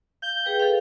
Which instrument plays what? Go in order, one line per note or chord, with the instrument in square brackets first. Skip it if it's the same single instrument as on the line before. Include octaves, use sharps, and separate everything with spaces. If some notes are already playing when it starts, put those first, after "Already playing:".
[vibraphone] F5 [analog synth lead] G6
[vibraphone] G#4 B4 G5
A4 F5